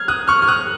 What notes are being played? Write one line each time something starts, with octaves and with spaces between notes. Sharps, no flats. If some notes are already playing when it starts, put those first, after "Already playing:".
Already playing: F6 G#6
D#6 F#6
C#6 F6
F6
D#6 F#6